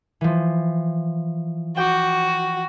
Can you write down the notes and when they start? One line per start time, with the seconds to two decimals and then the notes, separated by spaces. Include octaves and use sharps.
0.21 E3 F3
1.77 F#4 G5 D6